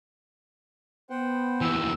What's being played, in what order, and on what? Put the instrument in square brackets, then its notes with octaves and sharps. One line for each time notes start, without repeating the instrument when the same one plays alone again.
[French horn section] B3 [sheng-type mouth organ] C5 F#5 G5
[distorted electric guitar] D#2 E3 [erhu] E6